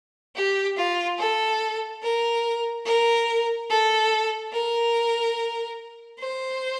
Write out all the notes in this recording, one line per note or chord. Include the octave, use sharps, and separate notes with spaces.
G4
F4
A4
A#4
A#4
A4
A#4
C5